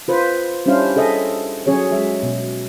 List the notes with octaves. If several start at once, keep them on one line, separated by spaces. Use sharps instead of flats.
F4 B4 C5
G3 C#4 D4 E4 C5 F5
G#4 A4 D#5 E5
F#3 C#4 G#4 C#5
F#3 G#3 E5
B2